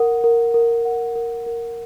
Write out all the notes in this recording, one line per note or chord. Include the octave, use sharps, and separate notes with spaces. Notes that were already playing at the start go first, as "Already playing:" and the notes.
Already playing: A#4 F#5
A#4
A#4
F#5
A#4
A#4